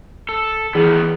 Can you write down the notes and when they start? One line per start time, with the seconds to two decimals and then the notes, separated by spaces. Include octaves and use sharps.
0.29 A4
0.75 D#3 E3 B3 E4 G#4